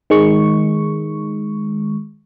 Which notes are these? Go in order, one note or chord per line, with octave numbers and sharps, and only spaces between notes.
D#3 G#3 C#6